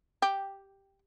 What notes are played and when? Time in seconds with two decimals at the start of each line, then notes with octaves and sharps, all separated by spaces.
0.22 G4